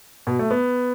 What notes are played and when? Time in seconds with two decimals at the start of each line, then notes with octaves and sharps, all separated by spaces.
0.27 B2
0.39 A3
0.51 B3